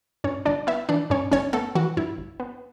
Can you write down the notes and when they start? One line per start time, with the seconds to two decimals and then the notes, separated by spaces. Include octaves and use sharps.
0.24 G2 C#4 C#5
0.45 G1 D4 D5
0.67 B3 E4 E5
0.89 E3 D4 D5
1.10 G2 C#4 C#5
1.32 G1 C#4 C#5
1.53 A3 B3 A4
1.75 E3 F#4
1.97 G2 E4
2.18 G1
2.40 B3